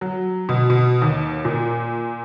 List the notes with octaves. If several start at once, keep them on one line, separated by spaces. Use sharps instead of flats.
F#3
B2
B2
D#2
A#2